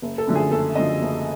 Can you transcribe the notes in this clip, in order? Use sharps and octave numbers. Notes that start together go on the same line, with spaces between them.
F#1
A4
F#2 D3 F3 A3
G#4
F#1 A4
F#2 D3 F3 A3 D#5
F#1